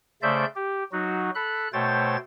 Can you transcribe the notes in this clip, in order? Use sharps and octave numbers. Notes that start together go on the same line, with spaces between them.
C#3 A3 C5 D5 E5 G6
G4
F#3 D#4 F#4
A4 B5 F#6
B2 A3 C5 C#5 G5 A6